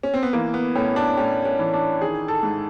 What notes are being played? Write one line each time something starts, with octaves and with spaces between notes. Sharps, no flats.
C#4
C4
B3
E3 A#3
B3
A2 C#4
D4
A2 C#4
C#4
E3
D4
D#3 G#4
A4
G#2